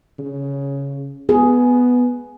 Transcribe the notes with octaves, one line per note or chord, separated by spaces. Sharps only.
C#3
B3 G#4